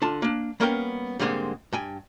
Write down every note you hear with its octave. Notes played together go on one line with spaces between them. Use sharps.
D3 F4 A5
A#3 D4
G3 A#3 B3 C#4 A#4 G5
G#2 D3 G3 G#3 A#3 C4
G2 G5 G#5